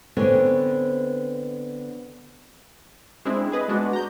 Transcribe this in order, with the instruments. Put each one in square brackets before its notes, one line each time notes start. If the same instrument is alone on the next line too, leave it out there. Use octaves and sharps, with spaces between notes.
[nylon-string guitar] D3 B3 C4 G#4 C#5
[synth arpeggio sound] G#3 C4 D4 E4 G#4
G#4 B4 D#5
G#3 B3 D4 F#4
A#5 G6